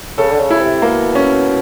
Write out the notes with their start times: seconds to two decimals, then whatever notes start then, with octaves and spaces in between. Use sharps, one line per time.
0.18 C#3 A4
0.32 D3
0.40 C#3
0.50 E4
0.60 C3
0.82 B2 A#3
1.15 C#4